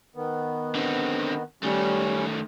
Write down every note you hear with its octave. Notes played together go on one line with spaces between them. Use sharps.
D#3 B3
D3 C4
D#3 G3 A3 C#4